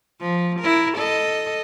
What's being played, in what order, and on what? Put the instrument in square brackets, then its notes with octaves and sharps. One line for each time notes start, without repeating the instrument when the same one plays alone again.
[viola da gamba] F3
E4 A#4
A4 D#5